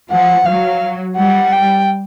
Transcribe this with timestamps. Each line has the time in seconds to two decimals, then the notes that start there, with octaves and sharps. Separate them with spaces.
0.11 F3 F#5
0.46 F#3 F5
1.16 G3 F#5
1.52 G5